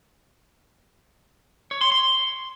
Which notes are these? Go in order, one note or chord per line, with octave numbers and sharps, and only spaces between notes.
C#5
C6
C6